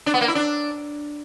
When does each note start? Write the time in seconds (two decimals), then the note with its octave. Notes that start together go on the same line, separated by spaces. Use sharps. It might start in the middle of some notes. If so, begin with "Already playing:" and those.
0.06 D4
0.14 B3
0.21 A#3
0.28 E4
0.35 D4